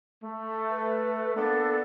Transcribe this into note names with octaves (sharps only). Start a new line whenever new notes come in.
A3
B4
A#3 B3 D4 A4